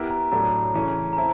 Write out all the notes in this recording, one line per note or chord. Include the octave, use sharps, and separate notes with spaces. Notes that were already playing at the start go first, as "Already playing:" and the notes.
Already playing: B3 E4 G4 A#4
A#5
A2 F#3 A3 D4 A#5
C#3 E3 A3 C#4
A#5
C4 E4 A5